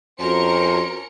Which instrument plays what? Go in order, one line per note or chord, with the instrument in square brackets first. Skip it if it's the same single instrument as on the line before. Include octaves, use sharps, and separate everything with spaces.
[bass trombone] F2 [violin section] C#4 A#4 C#7 [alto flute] F#4 [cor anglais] C5